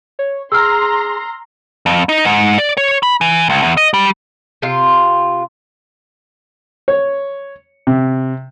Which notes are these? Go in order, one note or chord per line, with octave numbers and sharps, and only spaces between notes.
C#5
G#4 A#5 C6 E6 F6
F2
D#4
G#2
D5
C#5
B5
E3
C#2
E2
D#5
G3
C3 F4
C#5
C3